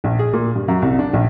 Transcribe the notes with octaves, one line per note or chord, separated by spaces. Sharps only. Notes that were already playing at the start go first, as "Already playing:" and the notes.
A#1
G#4
A#2
G2
F#2
C2
D4
A#1